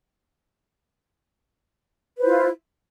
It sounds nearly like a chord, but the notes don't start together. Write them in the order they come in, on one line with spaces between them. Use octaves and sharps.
B4 C5 E4 F4